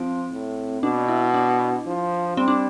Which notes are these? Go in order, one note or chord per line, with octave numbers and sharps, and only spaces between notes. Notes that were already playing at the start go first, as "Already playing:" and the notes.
Already playing: F3 C4
A2
B2 D4
E4
D4
F3
G3 C4
D4